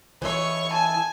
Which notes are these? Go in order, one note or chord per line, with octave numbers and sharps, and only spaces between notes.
E3 C#5 D#5 E5 C#6
G#5 A5